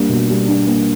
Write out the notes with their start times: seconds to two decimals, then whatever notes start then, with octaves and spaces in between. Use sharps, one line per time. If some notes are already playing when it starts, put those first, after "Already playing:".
Already playing: G3 A#3 D4
0.09 B2
0.28 G3
0.47 D4
0.66 A#3